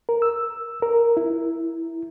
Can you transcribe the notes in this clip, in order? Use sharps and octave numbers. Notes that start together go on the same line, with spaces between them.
A#4
E6
A#4
E4